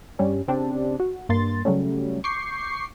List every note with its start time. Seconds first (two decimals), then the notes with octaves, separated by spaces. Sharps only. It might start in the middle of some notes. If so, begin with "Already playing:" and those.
0.19 G2 G3 C#4
0.48 C#3 C4 D4 G4
1.00 F#4
1.29 G2 A#3 C6 A6
1.65 C#3 F#3 G3 A3 C#4
2.24 C#6 D6 G6 C7